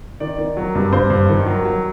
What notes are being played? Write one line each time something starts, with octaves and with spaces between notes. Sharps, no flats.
D#3 D5
D#3
F#3
G2
G2 C5
G2
D#3
F#3
F#3